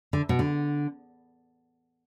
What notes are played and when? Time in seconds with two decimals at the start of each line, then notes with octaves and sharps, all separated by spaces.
0.13 D3
0.29 B2
0.39 D3